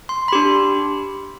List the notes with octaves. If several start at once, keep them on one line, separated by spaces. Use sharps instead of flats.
C6
B5
D4 G4 C6